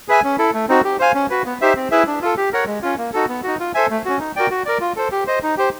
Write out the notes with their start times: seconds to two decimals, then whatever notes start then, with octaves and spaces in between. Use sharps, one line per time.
0.08 G#4 B4 E5 G#5
0.24 C#4
0.38 E4 A4
0.54 A3
0.69 C4 D#4 F#4
0.84 G4
0.99 C5 F5 G#5
1.14 C#4
1.30 F#4 B4
1.46 B3
1.61 D#4 G4 C5 E5
1.76 C4
1.91 E4 G#4 B4 E5
2.07 D4
2.22 F4 A4
2.37 G4
2.53 A#4 C#5 F#5
2.67 G#3
2.82 C#4 F4
2.98 A#3
3.13 D#4 F#4 A4
3.29 B3
3.43 D#4 F#4
3.60 F4
3.74 A4 C5 E5 G#5
3.90 A3
4.05 C#4 F#4
4.20 D#4
4.36 F#4 A#4 D5 G5
4.51 F#4
4.66 A#4 D5
4.81 F4
4.96 A4 C5
5.12 G4
5.27 C5 D#5
5.43 D#4
5.57 G4 C5